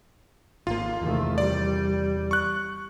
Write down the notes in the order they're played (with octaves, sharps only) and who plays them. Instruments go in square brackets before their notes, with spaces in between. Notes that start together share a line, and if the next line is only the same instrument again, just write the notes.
[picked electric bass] G#1 A#3 [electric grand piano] F4
[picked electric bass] E2 C3 [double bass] D#3 A3
[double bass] G3 [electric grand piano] D5
[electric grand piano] C#6 F#6